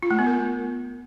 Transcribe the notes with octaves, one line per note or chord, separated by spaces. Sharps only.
F4
A3
B3
A#4